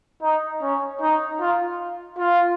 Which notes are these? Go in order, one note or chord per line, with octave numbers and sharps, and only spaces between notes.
D#4
C#4
D#4
F4
F4